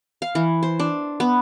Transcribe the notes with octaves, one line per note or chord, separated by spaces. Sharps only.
F5
E3
C5
D4
B3